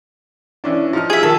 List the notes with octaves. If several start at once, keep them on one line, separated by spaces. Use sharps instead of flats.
E3 C#4 D4
F3 D#4 F6
G#4 E5
D#3 A4